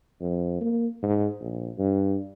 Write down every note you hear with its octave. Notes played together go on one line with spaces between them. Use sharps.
F2
A#3
G#2
A#1
G2